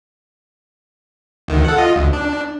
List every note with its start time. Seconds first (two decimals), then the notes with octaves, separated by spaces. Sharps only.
1.48 D2 D#3
1.65 A4 F#5
1.77 F4 D#5
1.96 D2
2.13 D4